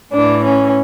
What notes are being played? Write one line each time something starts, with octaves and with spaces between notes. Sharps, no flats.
A2 E3 D4
C#4